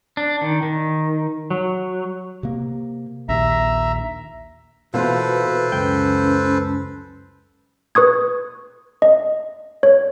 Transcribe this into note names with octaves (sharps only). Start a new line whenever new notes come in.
D4
D#3
D#3
F#3
C3 A#3
A#1 D#2 E5 A#5
B2 E3 A#3 F4 F#4 A4 B4 C5
C#2 F#2 C#4 G5
B4 C#6 D#6 G#6
D#5
C#5